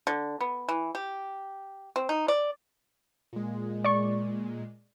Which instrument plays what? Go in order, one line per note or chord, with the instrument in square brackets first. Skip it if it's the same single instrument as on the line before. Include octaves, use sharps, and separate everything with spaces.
[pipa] D3
B3
E3
G4
C4
D#4
D5
[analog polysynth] A#2 G#3
[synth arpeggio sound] D5 C#6